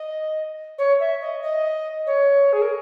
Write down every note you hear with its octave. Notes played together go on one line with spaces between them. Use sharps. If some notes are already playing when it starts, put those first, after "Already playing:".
Already playing: D#5
C#5
E5
D#5
D#5
C#5
G#4
A#4